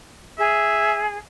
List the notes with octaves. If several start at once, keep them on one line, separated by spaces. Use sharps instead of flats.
G#4 E5